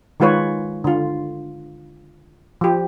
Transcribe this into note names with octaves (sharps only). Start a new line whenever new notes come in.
D#3 G#3 F4 B4 C#5
D3 F4
F3 G4